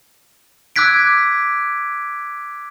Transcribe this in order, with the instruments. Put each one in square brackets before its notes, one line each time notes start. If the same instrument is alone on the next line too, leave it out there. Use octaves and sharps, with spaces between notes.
[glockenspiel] D6 E6 F#6 G#6 B6 D7